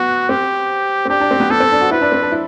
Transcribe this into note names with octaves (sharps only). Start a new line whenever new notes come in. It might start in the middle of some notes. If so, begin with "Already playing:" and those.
Already playing: B3 F#4
C4 G4
C4
D4 G4
D4
C4
B3
B3 A4
C4
D4
F#4
E4 B4
D4
C4
D4
E4